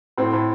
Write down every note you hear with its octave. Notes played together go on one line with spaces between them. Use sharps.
A2 C4
A2